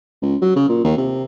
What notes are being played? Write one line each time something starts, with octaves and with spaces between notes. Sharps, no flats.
C#2
F#3
C#3
A#2
D#2
C3